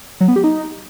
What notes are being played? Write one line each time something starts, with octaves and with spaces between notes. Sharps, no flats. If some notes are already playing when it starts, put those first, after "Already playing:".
F#3
B3
G4
D#4